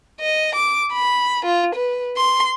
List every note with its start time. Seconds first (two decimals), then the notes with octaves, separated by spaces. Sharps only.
0.20 D#5
0.55 D6
0.93 B5
1.45 F4
1.75 B4
2.17 C6